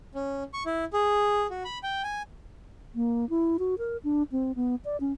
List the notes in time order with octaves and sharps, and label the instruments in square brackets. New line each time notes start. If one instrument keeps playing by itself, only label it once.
[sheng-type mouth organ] C#4
C#6
E4
G#4
F#4
B5
G5
G#5
[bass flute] A#3
E4
F#4
A#4
D4
C4
B3
D5
C#4